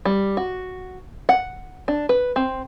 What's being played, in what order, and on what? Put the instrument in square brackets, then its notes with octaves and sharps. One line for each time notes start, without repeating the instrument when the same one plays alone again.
[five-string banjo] G3
F#4
F#5
D4
B4
C4